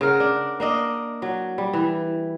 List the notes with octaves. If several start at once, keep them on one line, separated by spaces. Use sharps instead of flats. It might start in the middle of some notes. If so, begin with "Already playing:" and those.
C#3 A#4 F#5
D4
A#3 D4 D#5
F#3
G3
E3